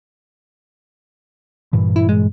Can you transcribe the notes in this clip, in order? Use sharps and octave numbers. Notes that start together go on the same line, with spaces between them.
G2 A#2 E3
E4
G#3